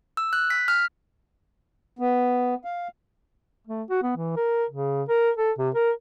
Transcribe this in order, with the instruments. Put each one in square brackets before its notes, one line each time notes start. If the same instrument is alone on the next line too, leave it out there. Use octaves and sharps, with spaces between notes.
[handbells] E6
F#6
B6
F6
[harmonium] B3
F5
[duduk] A3
F#4
B3
E3
A#4
C#3
A#4
A4
C3
A#4